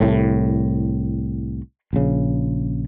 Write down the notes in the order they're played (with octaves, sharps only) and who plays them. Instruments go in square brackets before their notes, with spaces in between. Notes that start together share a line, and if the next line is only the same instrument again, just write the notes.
[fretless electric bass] C2 A2
A#1 C#3